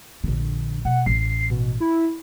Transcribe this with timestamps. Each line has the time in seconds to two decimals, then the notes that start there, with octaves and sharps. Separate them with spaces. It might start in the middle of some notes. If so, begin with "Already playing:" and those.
0.24 A#1 D3
0.85 B2 F#5
1.06 A1 C7
1.50 B2
1.80 E4